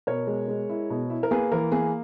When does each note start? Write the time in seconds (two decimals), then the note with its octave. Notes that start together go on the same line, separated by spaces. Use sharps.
0.07 B2 A#4 C#5
0.27 G#3
0.48 G#3
0.70 E4
0.90 B2
1.10 E4
1.23 A#4
1.31 A#3 G#4 B4
1.52 E3 A#4
1.72 A#3 G#4